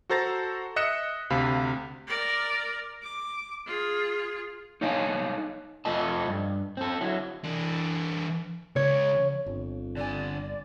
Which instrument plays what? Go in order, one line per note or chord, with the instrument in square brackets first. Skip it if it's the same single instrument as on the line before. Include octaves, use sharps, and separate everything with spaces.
[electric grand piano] F#4 A4 C5 A#5 A6 A#6
D#5 E5 F#6 C#7 E7
D2 C3 F5 B5
[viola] A#4 D5
D6
F4 G#4
[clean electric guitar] D#4 A4 C#5 D#5 F5 G#5
[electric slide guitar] F2 A3 F4 A4 D#5 A5
G2
C4 A4
F#3 E4
[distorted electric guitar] E3 D4
[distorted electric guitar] C#2 C#3 [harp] C#5
[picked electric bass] G1 [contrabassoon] F2
[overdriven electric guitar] D3 G#5 [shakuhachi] D5